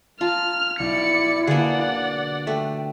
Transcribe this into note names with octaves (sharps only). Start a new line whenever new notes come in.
F4 A5 A#5 F6
B1 E4 D5 C#7
D3 A#3 F4 G#4 B4 D5 F#5
A3 G5